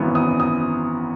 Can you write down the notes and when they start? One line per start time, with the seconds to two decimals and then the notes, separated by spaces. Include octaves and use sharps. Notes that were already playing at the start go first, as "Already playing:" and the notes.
Already playing: G#1 F#2 E3 B3
0.15 D#6
0.40 D#6